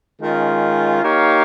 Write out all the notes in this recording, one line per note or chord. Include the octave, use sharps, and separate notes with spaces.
D#3 G#3 C#4 F4
A#3 D#4 G4 C#5 F5